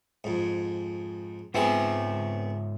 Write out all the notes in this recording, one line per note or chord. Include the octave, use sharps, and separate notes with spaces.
F2 G#2
G#2 B3 C4 F4 G#4 E5